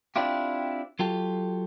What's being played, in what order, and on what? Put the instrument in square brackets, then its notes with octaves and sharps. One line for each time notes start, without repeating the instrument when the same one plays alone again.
[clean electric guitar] C4 D4 E4 F4 G4
F#3 F4 G4 A4